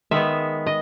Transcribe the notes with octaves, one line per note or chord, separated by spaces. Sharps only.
D#3 G#3 B3 E5
D#5